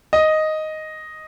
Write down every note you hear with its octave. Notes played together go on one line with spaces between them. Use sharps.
D#5